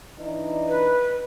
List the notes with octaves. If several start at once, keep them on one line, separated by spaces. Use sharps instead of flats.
E3 D4 D#4
B4